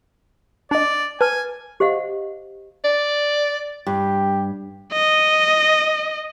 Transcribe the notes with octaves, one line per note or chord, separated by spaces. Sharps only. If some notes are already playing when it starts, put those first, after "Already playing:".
D4 D5 D#5
B4 G#5 A5 F6
G4 C5 D#5 F5 F#5
D5
G2 G4
D#5